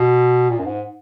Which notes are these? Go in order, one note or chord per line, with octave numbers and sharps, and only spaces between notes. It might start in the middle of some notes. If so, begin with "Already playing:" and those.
Already playing: B2
A#2
F#2
G#2